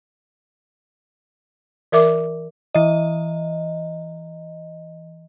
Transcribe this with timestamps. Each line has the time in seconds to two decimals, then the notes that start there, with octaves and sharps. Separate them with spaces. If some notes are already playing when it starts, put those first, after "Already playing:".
1.92 E3 A#4 E5 D6
2.75 E3 D#5